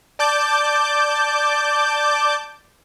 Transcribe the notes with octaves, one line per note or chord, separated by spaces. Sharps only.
D5 A5 D6 G6